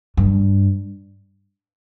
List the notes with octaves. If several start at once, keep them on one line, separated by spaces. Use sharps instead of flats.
G2